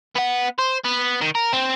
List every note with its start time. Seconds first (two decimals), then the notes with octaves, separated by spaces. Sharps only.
0.16 B3 F#5
0.59 C5
0.85 B3
1.22 D#3
1.35 A#4
1.53 C4